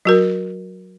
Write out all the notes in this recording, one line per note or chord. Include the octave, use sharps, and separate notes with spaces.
F#3 F#4 A#4